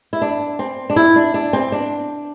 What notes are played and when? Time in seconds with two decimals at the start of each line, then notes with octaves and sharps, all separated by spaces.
0.13 E4
0.22 D4
0.59 C4
0.90 D4
0.96 E4
1.16 D4
1.34 D4
1.53 C4
1.72 D4